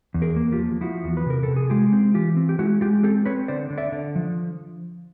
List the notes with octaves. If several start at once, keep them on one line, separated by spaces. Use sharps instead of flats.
E2
G#4 A#4
A#3
F4 G4
F3
F3 E4 F#4
E2
B4
C3 A#4
C3 A4
G#4
G#3 F4 G4
C4
E3 F4 G4
C4
G4
G#3 E4 F#4
G#3 F4 G4
C4 G4 A4
C4 B4 C#5
D3 C5 D5
D3
D5 E5
D3
F3